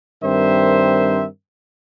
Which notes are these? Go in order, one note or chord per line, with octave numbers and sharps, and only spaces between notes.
G2 D#3 C4 A#4 C5 E5